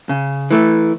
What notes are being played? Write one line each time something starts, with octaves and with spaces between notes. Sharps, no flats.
C#3
E3 A3